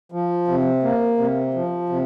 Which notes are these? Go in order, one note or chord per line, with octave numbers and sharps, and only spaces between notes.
F3
C3
A#3
C3
F3
C3